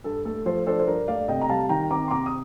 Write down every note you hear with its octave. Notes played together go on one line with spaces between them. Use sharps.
G2 A4
A3 A4
F3 A4 C5
D4 A4 C5
C5
G2 A#4
A3 D5 F5
C3 D#5 G5
A#5
G3 F5 A5
D#3 G5 A#5
C4 A#5 D6
C6
C3 A#5 D6
D#6